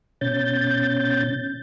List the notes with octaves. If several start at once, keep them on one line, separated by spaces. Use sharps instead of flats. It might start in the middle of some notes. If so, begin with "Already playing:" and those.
B2 C#4 G6 A6